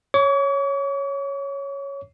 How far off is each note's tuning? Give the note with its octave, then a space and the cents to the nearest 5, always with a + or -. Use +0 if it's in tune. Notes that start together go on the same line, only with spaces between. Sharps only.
C#5 +0 C#6 +45